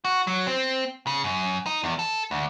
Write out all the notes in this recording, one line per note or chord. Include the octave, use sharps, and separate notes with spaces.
F#4
F#3
C4
C#3
F#2
D#4
E2
A4
D2